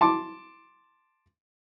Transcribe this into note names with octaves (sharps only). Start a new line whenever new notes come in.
A5 C6 D6